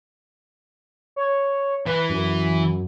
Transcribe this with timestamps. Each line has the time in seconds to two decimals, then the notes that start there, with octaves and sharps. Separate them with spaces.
1.16 C#5
1.87 E3 B4
2.09 F#2